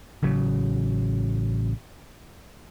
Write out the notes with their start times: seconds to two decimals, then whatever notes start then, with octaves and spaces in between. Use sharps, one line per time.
0.23 A1 C#3 F#3